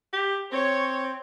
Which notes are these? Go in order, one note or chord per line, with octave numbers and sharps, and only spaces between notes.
G4
C4 C#5